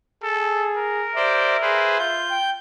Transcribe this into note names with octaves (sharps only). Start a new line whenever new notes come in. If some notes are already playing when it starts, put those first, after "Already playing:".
G#4 A4
A#4
G4 C5 D5 E5
G#4 B4 C5
F4 G6
G5